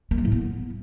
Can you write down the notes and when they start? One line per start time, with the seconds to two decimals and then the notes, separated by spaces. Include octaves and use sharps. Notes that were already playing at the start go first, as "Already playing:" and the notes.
0.11 A#3
0.18 F#3
0.25 A2
0.32 B3